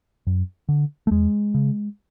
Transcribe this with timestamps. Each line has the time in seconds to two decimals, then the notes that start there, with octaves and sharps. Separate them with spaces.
0.27 F#2
0.69 D3
1.07 A3
1.11 E2 G#3
1.54 C#3